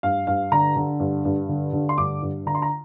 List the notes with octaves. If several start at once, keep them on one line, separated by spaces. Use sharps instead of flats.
G2 F5
G2 F5
D3 A#5
D3
G2
G2
D3
D3
C6
G2 D6
G2
D3 A#5
C6
A#5